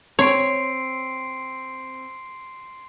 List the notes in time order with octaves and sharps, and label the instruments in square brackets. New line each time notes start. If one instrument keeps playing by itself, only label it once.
[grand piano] C4 [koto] C#5 [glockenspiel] C6 C7 D7